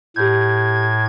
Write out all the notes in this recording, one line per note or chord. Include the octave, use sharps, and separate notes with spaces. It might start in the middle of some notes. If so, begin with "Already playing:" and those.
A2 G4 G6 G#6